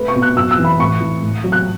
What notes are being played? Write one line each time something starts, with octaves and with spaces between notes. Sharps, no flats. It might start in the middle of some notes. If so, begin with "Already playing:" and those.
Already playing: A3 B4
C#6
B2
F#6
F#2 E6
E6
E3
B5
A2 C#6
E3
A2
F#3
F#6